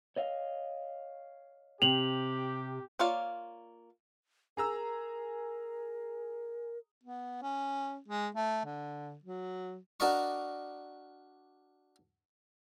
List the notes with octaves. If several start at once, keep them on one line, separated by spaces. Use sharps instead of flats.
C#5 D#5 F5
C3 G4 F7 F#7
A#3 F4 C#5 D5 F5
G#4 A#4 A#5 E6
B3
C#4
G#3
A3
D3
F#3
D4 F#4 A#4 D5 D#5 C#6